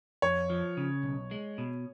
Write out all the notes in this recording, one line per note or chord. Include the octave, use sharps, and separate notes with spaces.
F2 C#5
F3
C#3
B1
G#3
B2